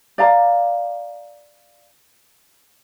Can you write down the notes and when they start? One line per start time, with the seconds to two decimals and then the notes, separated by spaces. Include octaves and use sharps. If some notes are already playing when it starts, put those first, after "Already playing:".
0.18 D5 F5 A#5